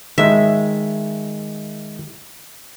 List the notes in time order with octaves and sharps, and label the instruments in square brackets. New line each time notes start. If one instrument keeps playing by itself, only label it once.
[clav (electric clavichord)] D#3 G#3 [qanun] E5